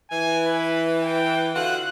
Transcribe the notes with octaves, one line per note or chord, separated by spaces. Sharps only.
E3 G#5
B4
G5
D3 F4 F#4 F#6